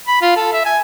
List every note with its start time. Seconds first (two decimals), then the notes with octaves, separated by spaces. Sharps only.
0.07 B5
0.22 F4
0.36 A4
0.53 E5
0.65 G#5